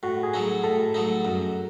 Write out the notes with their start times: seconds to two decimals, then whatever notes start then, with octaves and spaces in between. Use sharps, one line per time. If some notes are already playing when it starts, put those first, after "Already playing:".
0.03 A2 F#4
0.23 G#4
0.34 F#3 A3 D#4
0.63 A2 A4
0.94 F#3 A3 D#4
1.25 F#2